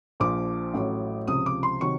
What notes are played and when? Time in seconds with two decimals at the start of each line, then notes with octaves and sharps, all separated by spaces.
0.20 A#1 A#2 F3 D6
0.74 A1 A2 F#3
1.27 C#2 C3 F3 D#6
1.46 D6
1.63 C6
1.81 C3 D#3 F#3 C#6